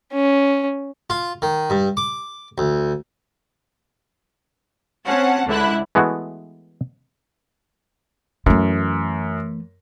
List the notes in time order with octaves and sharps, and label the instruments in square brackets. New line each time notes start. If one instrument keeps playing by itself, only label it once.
[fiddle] C#4
[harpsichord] F4
D#3
G2
D6
D2
[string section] C4 C#4 F#5 A5
C#2 D3 E4 F#6
[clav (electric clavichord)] E3 G#3 A3 B3 E4 F#4
[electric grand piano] F#2 [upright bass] E3 A3